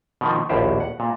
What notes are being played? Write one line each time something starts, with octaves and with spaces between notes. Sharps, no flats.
B2 D#3 F3
A#1 D#2 A2 G4 C5
F#5
A#2